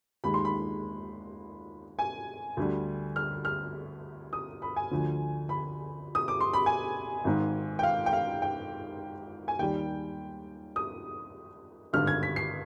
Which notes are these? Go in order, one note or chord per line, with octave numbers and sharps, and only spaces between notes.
D#2 D#3 G#3 B5
C6
B5
G#5
D2 D3 G3
F6
F6
D#6
B5
G#5
D2 D3 F3
B5
D#6
D6
C6
B5
G#5
G#1 G#2 D#3
G5
F5
G5
F5
G5
G#5
D#2 D#3 G3 G5
D#6
G#1 G2 D3 F6
G#6
B6
C7